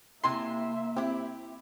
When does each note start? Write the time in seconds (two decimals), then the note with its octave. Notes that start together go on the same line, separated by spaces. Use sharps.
0.24 C3 A#3 E4 E5 G#5 C6
0.96 C4 E4 G4